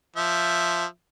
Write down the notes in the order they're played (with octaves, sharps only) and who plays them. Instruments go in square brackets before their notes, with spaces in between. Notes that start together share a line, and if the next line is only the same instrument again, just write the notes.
[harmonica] F3 E5